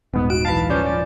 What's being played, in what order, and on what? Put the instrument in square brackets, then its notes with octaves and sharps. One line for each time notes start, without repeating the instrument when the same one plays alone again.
[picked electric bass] D#1 G#2 [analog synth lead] B3
[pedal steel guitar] F#4 [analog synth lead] D7
[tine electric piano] B1 E3 [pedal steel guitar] F5 B5 [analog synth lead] A5
[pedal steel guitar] F3 G3 [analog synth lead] C#4 [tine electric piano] B4 D5 G6
[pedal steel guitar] F3 [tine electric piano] D5